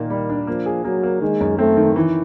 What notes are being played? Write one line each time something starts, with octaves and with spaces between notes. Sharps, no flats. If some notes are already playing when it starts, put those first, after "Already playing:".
Already playing: A#2 D#3 A#3
G3
D4
F3 A#3
G#4
F#3 A#3
A#3
D#3 G#3
F#2
A3 C4
D#3
E3